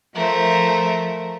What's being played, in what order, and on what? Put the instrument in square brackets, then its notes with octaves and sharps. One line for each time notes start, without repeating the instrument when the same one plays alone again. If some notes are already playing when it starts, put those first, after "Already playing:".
[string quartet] F3 A3 E5 [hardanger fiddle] A#4 C5